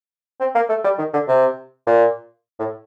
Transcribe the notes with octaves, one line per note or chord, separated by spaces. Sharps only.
C4
A#3
A3
G3
D#3
D3
C3
A#2
A2